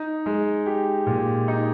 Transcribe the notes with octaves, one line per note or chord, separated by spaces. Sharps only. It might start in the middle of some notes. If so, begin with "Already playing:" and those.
Already playing: D#4
G#3
G4
A#2
D#4